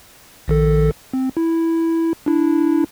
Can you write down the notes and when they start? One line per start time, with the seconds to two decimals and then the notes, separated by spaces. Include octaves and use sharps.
0.48 A#1 D#3 A4
1.13 C4
1.37 E4
2.26 D4 E4